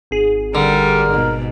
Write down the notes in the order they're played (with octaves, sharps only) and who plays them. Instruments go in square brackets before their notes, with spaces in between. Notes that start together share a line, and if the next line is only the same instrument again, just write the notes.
[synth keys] G#1 G#4
[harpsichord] D3 [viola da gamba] G3 [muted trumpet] A#4
[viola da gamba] G#2 B2